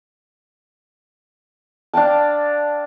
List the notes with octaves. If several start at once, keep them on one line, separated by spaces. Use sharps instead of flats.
D4 F5 G5 A5